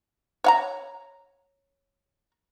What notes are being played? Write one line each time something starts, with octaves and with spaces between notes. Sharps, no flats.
C#5 F5 A#5